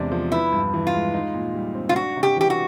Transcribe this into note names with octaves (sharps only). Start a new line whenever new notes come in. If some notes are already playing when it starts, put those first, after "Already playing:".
Already playing: E2 C3 G#3 D4
F3
B3 E4
G2
E3
F4
G#3
D#4
A#2
G3
C4
F4
D4 F#4
C3
G4
E3 G4
F#4